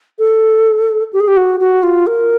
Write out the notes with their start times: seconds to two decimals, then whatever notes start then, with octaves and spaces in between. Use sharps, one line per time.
0.19 A4
1.13 G4
1.20 G#4
1.28 G4
1.37 F#4
1.60 F#4
1.83 F4
2.07 A#4